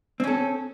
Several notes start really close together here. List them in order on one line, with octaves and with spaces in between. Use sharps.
C4 C#4 A4